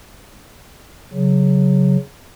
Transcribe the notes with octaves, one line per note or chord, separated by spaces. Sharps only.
C#3 F#3